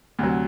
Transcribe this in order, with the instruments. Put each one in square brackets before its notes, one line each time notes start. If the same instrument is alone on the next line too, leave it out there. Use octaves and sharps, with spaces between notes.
[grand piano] D2 C3 F#3